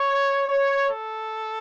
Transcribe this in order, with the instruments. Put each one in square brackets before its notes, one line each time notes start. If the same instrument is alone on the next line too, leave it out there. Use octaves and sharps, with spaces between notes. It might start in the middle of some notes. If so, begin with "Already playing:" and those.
Already playing: [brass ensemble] C#5
C#5
A4